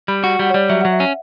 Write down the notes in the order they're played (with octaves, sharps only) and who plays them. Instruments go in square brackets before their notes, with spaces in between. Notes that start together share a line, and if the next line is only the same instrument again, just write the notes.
[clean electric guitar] G3 [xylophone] B5
[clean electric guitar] F#4
[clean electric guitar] G3 [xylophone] F#5
[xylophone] C#5
[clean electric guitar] G3 [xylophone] D5
[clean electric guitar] F#3 [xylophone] E5
[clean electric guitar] F#3 [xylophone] F#5
[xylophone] E5
[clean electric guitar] C#4